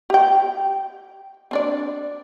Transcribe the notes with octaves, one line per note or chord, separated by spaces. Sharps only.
G4 G5
C4 D4 D5